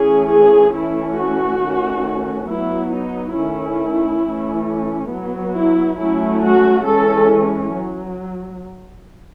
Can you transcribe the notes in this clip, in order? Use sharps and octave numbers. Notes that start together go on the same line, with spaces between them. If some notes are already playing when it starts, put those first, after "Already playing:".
Already playing: E3 A3 C#4 G#4
G#4
E3 A3 C#4 E4
F#4
D#3 A3 C#4
F#3 B3 E4
D#4
D#3 A3 C#4 E4
E3 A3 C#4
F#3 B3
E4
F#3 A3 C#4 E4
F#4
E3 G#3 C#4 A4
F#3